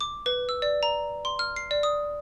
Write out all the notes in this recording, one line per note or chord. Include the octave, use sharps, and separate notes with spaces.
D6
B4
E6
D5
A#5
C6
F6
C7
D5
D#6